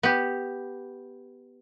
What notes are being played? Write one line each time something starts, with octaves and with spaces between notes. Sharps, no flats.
B3 G4